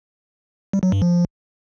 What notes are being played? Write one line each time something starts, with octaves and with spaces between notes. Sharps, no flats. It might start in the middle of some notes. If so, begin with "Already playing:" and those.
G3
F#3
G2
F3